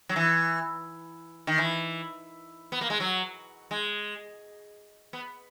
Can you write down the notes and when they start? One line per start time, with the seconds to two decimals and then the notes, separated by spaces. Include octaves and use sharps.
0.09 F#3
0.16 E3
1.47 D#3
1.58 E3
2.72 B3
2.81 A#3
2.90 G#3
3.00 F#3
3.71 G#3
5.13 B3